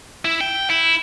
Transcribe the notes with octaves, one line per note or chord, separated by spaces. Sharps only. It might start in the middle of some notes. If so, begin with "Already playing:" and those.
E4
G5
E4